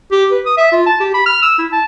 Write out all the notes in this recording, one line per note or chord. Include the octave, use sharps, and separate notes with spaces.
G4
B4
D#6
E5
F4
A5
G4
B5
F6
E6
E4
A5